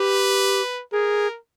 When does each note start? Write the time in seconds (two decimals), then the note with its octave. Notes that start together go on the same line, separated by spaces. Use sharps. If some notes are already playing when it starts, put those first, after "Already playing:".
Already playing: G4 B4
0.92 G#4 A#4